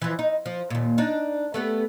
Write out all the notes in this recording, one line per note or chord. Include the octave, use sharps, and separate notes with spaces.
E3 F3
D#4
F3
D#2 A#2
D4 D#4
A3 B3 G4